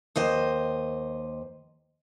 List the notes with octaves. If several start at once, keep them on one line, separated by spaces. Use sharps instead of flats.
D#2 C5 D#5